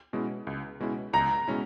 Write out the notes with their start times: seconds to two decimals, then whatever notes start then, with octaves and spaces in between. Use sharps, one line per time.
0.13 B2 G#3 C#4 E4
0.47 C#2
0.80 B2 G#3 C#4 E4
1.13 C#2 A#5
1.48 B2 G#3 C#4 E4